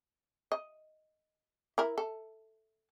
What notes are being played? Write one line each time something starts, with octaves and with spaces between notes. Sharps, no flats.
D#5
E4 A#4
A4